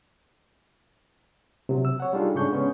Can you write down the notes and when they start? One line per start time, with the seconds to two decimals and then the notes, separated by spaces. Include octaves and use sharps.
1.69 C3 F#3
1.85 E6
2.00 C#5 F#5
2.13 G3 D4 D#4 F4 G#4 A4
2.34 G#2 C#3 D4 G#4 C#6 G6
2.51 G#3 B3 C#4